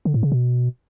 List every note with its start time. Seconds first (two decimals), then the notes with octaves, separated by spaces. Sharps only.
0.05 D3
0.14 A2
0.23 C#3
0.32 B2